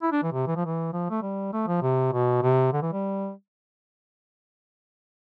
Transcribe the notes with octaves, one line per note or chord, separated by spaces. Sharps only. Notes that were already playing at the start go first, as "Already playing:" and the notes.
E4
D4
E3
C3
E3
F3
E3
F3
A3
G3
A3
F3
C3
B2
C3
D3
E3
G3